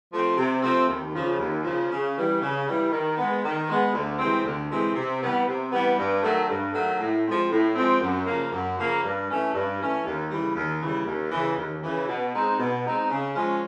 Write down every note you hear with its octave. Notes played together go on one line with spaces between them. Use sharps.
F3 A3 C4
C3
F3 A3 C4
D#2
C#3 F3
D#2
C#3 F3
C#3
E3 G3
C#3
E3 G3
D#3
G#3 B3
D#3
G#3 B3
D2
C3 E3 G#3 C4
D2
C3 E3 G#3 C4
C3
E3 G3 B3
C3
E3 G3 B3
G2
D#3 F#3 A3
G2
D#3 F#3 A3
A2
F3 G#3 C4
A2
F3 G#3 C4
F#2
C#3 F3 A#3
F#2
C#3 F3 A#3
G2
E3 A3 C#4
G2
E3 A3 C#4
D#2
C#3 E3 G3
D#2
C#3 E3 G3
D#2
C#3 E3
D#2
C#3 E3
B2
G#3 C4 D#4
B2
G#3 C4 D#4
C#3
F3 G#3 C#4